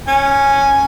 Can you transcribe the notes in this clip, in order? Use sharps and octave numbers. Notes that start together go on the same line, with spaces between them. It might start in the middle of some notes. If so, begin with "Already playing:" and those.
C#4 G#5